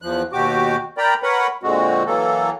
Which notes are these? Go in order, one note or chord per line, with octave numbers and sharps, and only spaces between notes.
E2 F3 F#6
D#2 B2 F#4 G4 D6
A#4 D5 G5 A#5 B5
A#4 B4 C#5 F#5 B5
A#2 D3 G#3 C4 F#4
E3 F#3 A#3 A4